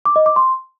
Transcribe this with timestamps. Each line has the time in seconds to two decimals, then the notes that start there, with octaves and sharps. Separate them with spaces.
0.05 D6
0.16 D#5
0.26 D6
0.36 C6